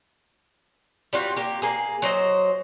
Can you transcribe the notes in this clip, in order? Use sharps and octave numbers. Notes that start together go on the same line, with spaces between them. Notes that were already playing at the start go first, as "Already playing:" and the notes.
G3 F4 F#4
A#3 G4
A#3 G#4
F#3 C5 D#5